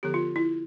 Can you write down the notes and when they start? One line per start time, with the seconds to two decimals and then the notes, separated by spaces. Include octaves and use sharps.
0.03 D3 F3 B3 G4
0.14 F4
0.36 E4